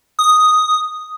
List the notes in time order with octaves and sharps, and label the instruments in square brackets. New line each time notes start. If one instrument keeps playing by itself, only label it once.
[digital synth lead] D#6